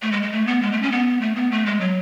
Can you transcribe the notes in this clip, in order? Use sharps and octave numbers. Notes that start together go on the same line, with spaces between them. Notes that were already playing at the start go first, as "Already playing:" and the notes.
A3
G#3
G#3
A3
B3
G#3
A3
C#4
B3
A3
B3
A3
G#3
F#3